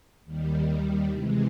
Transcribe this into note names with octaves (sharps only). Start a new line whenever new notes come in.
D#2 D#3 G3
C3 E3 G#3